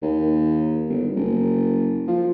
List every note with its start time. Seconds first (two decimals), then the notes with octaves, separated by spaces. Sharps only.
0.03 D#2
0.90 G1
1.16 F#1
2.08 F3